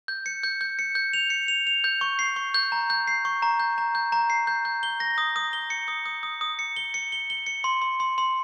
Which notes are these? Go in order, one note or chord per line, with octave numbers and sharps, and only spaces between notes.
G6
C#7
G6
G6
C#7
G6
F7
C#7
F7
F7
G6
C#6
C7
C#6
G6
A#5
G6
C7
C#6
A#5
G6
A#5
G6
A#5
C7
G6
G6
G7
A#6
D#6
D#6
G7
C#7
D#6
D#6
D#6
D#6
C#7
G7
C#7
G7
G7
C#7
C6
C6
C6
C6